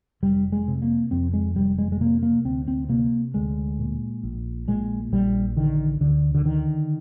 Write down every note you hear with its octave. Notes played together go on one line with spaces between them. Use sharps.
F1 G3
G#3
C3
A#3
F2 C4
G#3
F1 G3
G#3
G#3
C3 A#3
A#3
D2 C4
C4
C3 A#3
D2 G#3
A#2
A#1
A#2 G#3
A#1 G3
D3 D#3
D2 D3
D3
D3 D#3